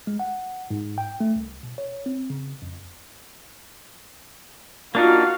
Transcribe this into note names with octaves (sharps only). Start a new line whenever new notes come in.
G#3
F#5
G#2
G5
A3
C2
B2
C#5
C4
C#3
F2
A#3 D4 D#4 F4 F#4 F5